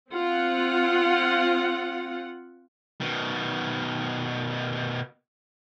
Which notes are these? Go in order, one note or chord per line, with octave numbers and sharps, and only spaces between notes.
C4 F4 F#5
B2 D#3